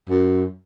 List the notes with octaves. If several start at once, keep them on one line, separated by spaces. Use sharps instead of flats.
F#2